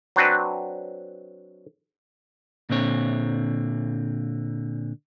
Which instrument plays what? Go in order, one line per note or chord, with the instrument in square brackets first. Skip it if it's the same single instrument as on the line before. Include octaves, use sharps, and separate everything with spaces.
[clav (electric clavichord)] F#3 C4 D4 F#4 B4
[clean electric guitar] A#2 D3 C4 C#5